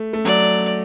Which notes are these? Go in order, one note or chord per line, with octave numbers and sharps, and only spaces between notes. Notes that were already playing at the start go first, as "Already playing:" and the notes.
Already playing: A3
A3
F#3 D5